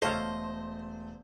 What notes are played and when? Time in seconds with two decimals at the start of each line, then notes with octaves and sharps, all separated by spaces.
0.02 E1 A3 A4 C5 C#5 D#5 F5 G6